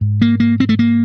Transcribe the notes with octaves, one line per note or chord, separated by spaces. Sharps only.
G#2
A#3
A#3
C4
A3
A#3